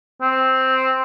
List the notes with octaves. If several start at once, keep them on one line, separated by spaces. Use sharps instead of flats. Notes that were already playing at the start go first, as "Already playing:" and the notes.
C4